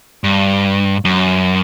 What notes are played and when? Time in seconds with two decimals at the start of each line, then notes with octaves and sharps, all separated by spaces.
0.24 G2
1.05 F#2